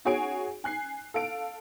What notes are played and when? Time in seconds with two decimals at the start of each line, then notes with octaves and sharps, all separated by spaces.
0.05 D#4 F#4 G#4 C#5 G#5 D7
0.64 G#5 F#6 C7
1.14 A4 F5 D7